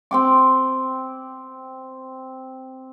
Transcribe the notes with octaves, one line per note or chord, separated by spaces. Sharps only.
C4 G5 D6